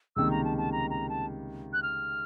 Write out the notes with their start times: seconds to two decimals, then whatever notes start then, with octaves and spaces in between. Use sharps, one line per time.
0.16 C#2 C3 D#3 G3 A#3 E6
0.31 A#5
0.44 A5
0.57 A5
0.72 A#5
0.90 A#5
1.09 A5
1.73 F#6
1.83 F6